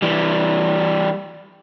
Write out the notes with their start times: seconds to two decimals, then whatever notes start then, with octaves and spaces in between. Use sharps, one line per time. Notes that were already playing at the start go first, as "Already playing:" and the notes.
0.02 E3 G3